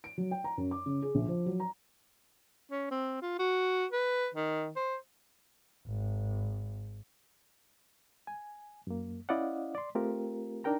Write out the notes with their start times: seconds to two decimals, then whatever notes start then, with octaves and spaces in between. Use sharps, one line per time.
0.04 D7
0.18 F#3
0.31 G5
0.44 A#5
0.58 F#2
0.71 D6
0.86 C#3
1.02 G#4
1.15 A#1
1.28 F3
1.46 F#3
1.60 A#5
2.71 C#4
2.91 C4
3.22 F4
3.39 F#4
3.91 B4
4.35 D#3
4.76 C5
5.87 G#1
8.27 G#5
8.87 F#2 A#3
9.29 C#4 E4 D5 D#5 F5 F#5
9.75 D5 C6
9.95 A3 C4 F4 G4 A#4
10.64 D4 D#4 A#4 G5 A#5